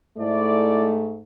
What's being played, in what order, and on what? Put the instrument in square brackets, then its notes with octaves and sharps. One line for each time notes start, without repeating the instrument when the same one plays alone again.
[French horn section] G#2 A3 [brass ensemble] E4 D5